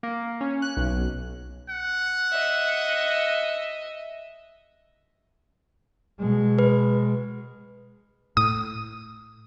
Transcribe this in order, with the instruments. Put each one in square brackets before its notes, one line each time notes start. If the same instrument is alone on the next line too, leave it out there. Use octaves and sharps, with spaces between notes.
[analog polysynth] A#3
C#4
F#6
B1
[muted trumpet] F#5
[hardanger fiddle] D#5 E5
[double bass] B2 G#3
[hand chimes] B4
[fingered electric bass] A2 [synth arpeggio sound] D#6